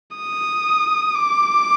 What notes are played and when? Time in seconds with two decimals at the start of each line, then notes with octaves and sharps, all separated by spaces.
0.17 D#6
1.15 D6